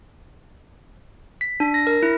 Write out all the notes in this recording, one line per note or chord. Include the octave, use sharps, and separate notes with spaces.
B6
D4
A#6
A#4
E4